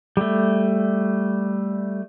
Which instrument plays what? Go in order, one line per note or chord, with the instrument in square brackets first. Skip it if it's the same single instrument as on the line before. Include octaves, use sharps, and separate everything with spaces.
[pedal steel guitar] G3 A3